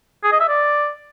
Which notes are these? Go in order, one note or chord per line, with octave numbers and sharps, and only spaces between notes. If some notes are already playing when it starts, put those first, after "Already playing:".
G#4
D#5
E5
D5